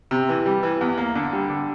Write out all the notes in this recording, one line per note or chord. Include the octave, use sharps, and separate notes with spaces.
C3
E3
G3
E3
E2
A#3
D3
G3
D3